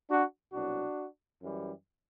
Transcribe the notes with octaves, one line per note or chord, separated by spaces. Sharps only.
D4 F#4
C2 B2 F#3 D4 F#4
F#2 E3 G3